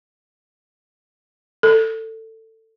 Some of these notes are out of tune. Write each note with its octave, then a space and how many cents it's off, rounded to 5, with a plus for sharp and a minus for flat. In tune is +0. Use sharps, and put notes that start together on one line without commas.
A4 +20